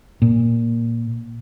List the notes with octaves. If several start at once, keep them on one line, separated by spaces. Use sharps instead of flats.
A#2